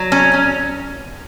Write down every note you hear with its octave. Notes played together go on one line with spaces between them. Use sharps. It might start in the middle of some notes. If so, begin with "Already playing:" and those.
Already playing: F#3
C#4
C#4